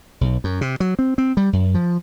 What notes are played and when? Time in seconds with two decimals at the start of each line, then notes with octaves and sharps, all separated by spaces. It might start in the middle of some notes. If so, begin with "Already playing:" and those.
0.21 B1
0.44 F#2
0.61 C3
0.80 F#3
0.99 C4
1.18 C4
1.37 G3
1.53 F#2
1.75 F3